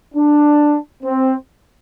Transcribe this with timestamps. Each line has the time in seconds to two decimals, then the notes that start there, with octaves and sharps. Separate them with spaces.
0.15 D4
1.03 C4